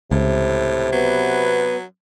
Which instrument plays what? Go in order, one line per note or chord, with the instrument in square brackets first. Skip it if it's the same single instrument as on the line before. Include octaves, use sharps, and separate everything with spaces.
[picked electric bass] C#2 [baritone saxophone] A2 [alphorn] C3
[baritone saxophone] F#3 [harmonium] B3 B4